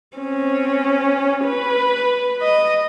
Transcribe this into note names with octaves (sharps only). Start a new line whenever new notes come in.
C4 C#4
B4
D#5